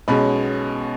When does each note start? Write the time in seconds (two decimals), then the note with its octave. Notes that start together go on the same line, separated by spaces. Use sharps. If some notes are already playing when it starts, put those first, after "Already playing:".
0.08 B1 B2 G#3 C#4 B5